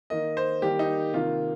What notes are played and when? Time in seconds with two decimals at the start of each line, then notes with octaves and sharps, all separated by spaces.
0.10 D#3 A#3 D#5
0.37 C5
0.62 D#3 G3 A#3 G4
0.79 D#4
1.14 C3 D#3 A#3 F4